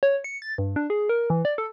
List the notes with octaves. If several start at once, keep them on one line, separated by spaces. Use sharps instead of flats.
C#5
C#7
A6
G2
D4
G#4
A#4
E3
D5
A4